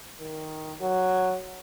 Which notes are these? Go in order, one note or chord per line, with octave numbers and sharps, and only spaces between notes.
D#3
F#3